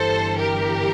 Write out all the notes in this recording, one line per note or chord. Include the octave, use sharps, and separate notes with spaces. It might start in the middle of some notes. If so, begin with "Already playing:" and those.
Already playing: G1 G2 E3 G3 A4 C5
G4 A#4